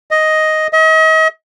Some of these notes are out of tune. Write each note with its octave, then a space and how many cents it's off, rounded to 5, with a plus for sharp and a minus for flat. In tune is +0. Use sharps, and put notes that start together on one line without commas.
D#5 +5
D#5 +40